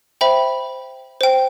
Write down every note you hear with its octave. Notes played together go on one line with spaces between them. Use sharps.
C5 E5 G5 B5
C5 G5